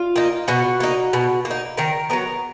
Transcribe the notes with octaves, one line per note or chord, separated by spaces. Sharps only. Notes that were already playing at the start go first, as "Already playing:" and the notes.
Already playing: F4 F5
A#3 D#4
B2 F#4 F#5
A#3 D#4
B2
A#3
D#4
D#3 A#4 A#5
F#3 B3 A#4 A#5